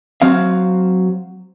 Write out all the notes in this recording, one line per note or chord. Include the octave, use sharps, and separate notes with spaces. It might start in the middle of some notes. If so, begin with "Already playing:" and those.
F#3 C4 F5